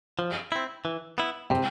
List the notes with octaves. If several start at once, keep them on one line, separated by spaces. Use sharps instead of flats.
F3
C4 E4
E3
B3 E4
C3 G5